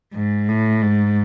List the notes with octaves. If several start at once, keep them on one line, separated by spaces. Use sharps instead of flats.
G#2
A2
G#2